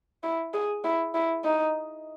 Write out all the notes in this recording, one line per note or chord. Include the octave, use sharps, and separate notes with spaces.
E4
G#4
E4
E4
D#4